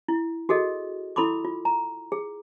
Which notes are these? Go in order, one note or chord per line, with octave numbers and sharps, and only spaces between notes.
E4
F#4 G#4 A4 D#5
E4 A4 B5 C6 D6
F4
A#5
G#4